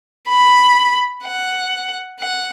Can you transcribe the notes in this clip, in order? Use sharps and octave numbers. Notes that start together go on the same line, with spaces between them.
B5
F#5
F#5